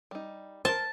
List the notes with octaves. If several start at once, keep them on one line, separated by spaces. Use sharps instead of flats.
G3 D#4
A#4 C5 A5